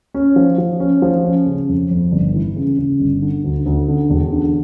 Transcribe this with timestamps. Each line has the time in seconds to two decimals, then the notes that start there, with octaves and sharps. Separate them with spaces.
0.14 C#4
0.36 F3
0.58 F3
0.80 C#4
1.02 F3
1.24 C#4
1.46 C#3
1.68 F2
1.90 F2
2.12 G1
2.34 E3
2.56 C#3
2.78 C#3
3.00 G1
3.22 D3
3.44 D2
3.66 D2
3.88 D3
4.10 E1
4.32 D3